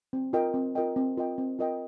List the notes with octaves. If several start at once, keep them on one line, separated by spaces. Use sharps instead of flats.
C4
F4 A#4 D#5 G5
C4
F4 A#4 D#5 G5
C4
F4 A#4 D#5 G5
C4
F4 A#4 D#5 G5